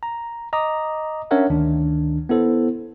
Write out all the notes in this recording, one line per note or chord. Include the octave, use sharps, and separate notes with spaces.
A#5
D#5 A#5 D6 D#6
C#4 D4 A#4 C#5 E5 F#5
D2 D#3 D4
B3 E4 A4 C5